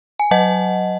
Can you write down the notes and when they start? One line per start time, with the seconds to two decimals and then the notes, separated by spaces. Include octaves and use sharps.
0.19 G#5
0.31 F#3 D#5 F#5